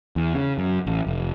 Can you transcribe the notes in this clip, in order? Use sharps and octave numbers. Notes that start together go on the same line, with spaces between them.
E2
C#3
F#2
A1
F1